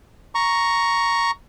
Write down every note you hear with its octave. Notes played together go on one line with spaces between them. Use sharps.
A#5 C#6